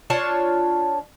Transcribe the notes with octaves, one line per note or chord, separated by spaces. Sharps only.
D4 F4 C#5 A5